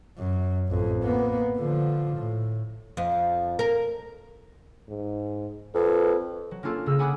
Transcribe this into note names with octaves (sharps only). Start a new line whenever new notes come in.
F#2
A1 F2
A#3 B3
D3 F3
A2
F2
A#4
G#2
F2 B4
F#3
A#3 C#4 D4 F4 A4
C#3 E6
F#5 G#5 B5 D6 D#6 F#6